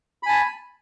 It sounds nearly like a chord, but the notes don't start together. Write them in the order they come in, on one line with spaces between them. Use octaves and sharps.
B5 G#5 A5